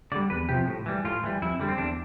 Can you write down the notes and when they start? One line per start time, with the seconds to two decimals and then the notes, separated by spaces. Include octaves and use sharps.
0.12 D3 G3 D5
0.30 E2 B4
0.49 C3 F3 G4
0.68 A2
0.86 E3 G3
1.05 A2 F4
1.23 E3 G3
1.42 F2 E4
1.60 D3 G3
1.68 C4
1.78 E2 D4